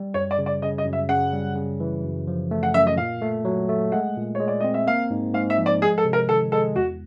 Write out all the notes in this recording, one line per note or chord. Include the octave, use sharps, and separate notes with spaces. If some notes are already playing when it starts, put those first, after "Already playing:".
Already playing: G3
F#2 C#5
D5
C#3
D5
C#3 D#5
D#5
F#2
E5
C#3 F#5
G3
C#3
E3
F#2
F3
A3
F#5
F#2 E5
D#5
A#2 F5
A3
F#3
A3
G#3 F#5
A#2
G#3 C#5
D5
C4 D#5
E5
A#3 F5
G#2
G#2 F5
E5
F3
D5
G#3 G#4
A4
C3
A#4
D#3 A4
G#3 A4
E2 F#4